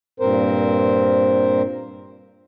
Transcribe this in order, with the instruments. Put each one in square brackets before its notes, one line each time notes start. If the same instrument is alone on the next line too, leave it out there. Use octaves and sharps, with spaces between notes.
[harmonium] G2 A#2 C4 A#4 C5